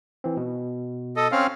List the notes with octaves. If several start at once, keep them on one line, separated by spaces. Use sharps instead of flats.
E3 C4
B2
A4 D#5
C4 C#4 F5